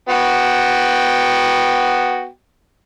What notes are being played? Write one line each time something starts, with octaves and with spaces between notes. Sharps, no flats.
B3 F#4 G5